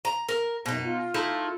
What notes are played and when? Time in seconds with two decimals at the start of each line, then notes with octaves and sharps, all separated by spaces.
0.05 A#5
0.29 A#4
0.66 F#2 B2 D#4
0.85 F4
1.14 A3 D#4 E4